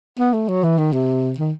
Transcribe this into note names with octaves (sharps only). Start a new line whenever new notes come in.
B3
A3
F#3
E3
D#3
C3
D#3